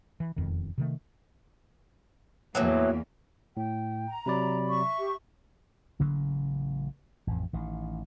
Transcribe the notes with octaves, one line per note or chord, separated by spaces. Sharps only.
E3
E1 F2 D#3
C3 D#3 A3
E2 A2 E3 F#3 A#3
A2 G5
A#5
C3 F#3 D5 B5
E5 C#6
G4
A1 C#3 F#3 A#3
A1 F2
A1 D#3